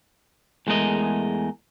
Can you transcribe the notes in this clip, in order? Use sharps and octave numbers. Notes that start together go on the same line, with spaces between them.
E2 G#3 A3 A#4 D#5